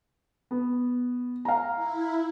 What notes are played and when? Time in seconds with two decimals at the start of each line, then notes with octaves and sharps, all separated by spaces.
0.51 B3
1.45 F5 A#5
1.75 E4